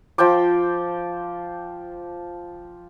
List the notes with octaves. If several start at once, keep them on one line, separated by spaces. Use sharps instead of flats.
F3 C5 G5 D6